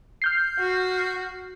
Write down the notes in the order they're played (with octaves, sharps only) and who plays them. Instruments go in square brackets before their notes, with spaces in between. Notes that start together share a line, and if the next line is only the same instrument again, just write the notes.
[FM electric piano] F6 G6 C7
[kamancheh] F#4